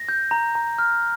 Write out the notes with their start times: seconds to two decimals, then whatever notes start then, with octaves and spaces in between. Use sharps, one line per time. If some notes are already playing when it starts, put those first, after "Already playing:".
Already playing: A#6
0.09 G6
0.31 A#5
0.55 A#5
0.78 F6